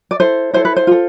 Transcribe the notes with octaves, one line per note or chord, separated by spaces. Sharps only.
D5
E4 A4 C5
E4 A4 C5
B4
C5
F4 A4